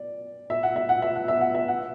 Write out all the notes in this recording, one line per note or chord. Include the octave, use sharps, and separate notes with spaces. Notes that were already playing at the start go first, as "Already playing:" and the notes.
Already playing: D5
E5
F#5
E5
F#5
E5
F#5
E5
F#5
E5
F#5